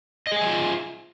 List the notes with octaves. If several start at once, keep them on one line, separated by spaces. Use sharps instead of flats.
F4 G#4 D#5 E5 G#5